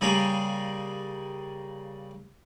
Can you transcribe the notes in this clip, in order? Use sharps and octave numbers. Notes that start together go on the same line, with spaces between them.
C#3 G3 A#3 G#4 A#5 B5